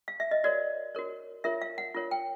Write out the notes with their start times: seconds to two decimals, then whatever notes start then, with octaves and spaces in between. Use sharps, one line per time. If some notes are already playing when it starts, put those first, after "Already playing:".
0.08 F5
0.20 E5
0.31 D#5
0.44 F#4 A#4 C#5 D5
0.95 F#4 A#4 C#5
1.44 F4 A#4 C#5 E5
1.62 F5
1.78 F#5
1.95 F4 A#4 C#5
2.11 G5